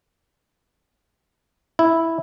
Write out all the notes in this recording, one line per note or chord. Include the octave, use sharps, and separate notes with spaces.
E4